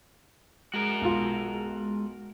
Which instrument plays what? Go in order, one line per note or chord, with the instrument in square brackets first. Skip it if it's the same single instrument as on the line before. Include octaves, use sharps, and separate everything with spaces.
[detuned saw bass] G#3 [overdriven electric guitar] F#4 A#4
[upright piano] B1 F4